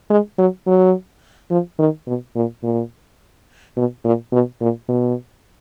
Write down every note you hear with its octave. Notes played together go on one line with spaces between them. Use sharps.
G#3
F#3
F#3
F3
D#3
B2
A#2
A#2
B2
A#2
B2
A#2
B2